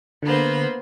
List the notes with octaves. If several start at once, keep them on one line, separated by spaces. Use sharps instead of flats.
D3 A#3 B3 C5